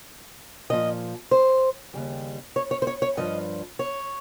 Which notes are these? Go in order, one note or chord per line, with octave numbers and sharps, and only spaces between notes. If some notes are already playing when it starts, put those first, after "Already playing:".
A#2 F3 D#5
C5
D#2 C#3 G3
C#5
C#5
C5
C#5
C#5
G2 F3 D#5
C#5